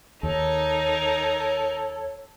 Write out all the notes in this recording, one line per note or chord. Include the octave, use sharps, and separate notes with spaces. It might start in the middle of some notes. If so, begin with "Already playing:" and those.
D#2 D#4 A4 A#4 C#5